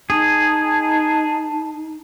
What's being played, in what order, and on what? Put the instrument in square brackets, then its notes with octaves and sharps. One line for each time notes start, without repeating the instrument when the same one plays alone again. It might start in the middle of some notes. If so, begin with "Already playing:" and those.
[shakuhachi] D#4 [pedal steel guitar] G#4 [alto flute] A5